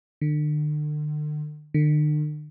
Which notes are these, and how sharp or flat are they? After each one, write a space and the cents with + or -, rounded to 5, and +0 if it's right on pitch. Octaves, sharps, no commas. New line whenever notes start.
D3 +40
D3 +45